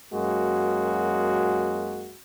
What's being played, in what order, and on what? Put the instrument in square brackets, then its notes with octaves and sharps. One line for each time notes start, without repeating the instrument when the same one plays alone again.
[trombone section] F#2 G#3 A#3 F#4